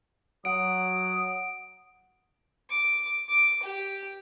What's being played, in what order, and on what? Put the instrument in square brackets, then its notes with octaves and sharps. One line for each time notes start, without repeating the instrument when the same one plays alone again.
[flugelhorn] F#3 [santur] F#5 [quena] D#6 [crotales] D7
[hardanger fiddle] D6
D6
G4